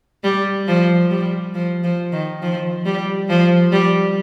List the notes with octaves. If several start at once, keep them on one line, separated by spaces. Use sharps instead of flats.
G3
F3
G3
F3
F3
D#3
F3
G3
F3
G3